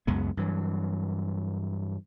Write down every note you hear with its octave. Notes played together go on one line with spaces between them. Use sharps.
C#2 F#2 G#3 B3
G2 E3 F#3